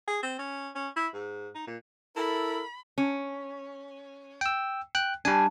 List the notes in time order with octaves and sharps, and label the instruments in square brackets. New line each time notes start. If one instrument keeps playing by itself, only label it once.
[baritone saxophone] G#4
C4
C#4
C#4
E4
G#2
D#4
A#2
[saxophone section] E4 [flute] A4 [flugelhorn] A#4 [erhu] B5
[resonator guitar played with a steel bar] C#4
[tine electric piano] G5 E6
G5 F#6
[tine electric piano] G3 G#5 [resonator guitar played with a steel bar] D4